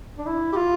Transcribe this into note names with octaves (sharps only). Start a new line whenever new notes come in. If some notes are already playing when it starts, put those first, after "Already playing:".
D4
E4
G4
F4